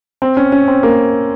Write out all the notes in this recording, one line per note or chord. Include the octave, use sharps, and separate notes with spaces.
C4
C#4
C#4
C4
A#3